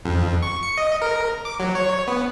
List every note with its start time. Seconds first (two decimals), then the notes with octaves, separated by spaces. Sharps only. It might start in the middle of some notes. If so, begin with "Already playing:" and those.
0.05 F2
0.42 C#6
0.63 C#7
0.78 D#5
1.02 A#4
1.45 D6
1.60 F#3
1.75 C#5
2.08 B3